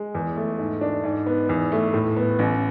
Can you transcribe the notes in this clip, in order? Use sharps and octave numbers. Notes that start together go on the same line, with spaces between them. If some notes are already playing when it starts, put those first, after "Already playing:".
Already playing: G#3
E2
A3
G#2
D4
G#2
B3
E2
A3
A2
B3
A1